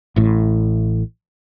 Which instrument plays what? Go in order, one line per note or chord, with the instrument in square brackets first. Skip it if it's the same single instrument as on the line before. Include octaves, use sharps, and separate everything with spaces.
[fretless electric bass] A1 A2